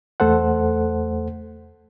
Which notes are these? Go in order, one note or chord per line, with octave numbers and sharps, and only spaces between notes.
E2 A3 A4 C5 F#5